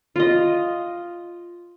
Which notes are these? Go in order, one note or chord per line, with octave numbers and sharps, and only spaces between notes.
F4 D#5